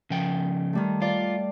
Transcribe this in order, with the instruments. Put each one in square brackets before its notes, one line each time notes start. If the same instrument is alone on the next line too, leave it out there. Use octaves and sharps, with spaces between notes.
[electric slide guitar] C#3 F3 G5
[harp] D#3 G3 A3
[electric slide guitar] F4 [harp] D5